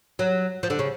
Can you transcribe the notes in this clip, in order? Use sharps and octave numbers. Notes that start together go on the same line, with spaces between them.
F#3
F3
D3
C#3